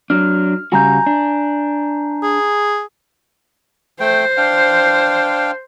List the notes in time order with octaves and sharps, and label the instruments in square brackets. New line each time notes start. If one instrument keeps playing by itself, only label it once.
[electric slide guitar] F#3 D4 [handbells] F6
[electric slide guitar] C#3 G3 F#4 [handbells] G#5 A#5 G6
[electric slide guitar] D4
[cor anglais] G#4
[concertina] A3 G5 [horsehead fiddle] C5
[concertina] D4 F5 G5